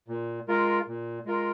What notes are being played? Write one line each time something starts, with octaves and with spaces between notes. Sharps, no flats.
A#2
G#3 F4 A#4
A#2
G#3 F4 A#4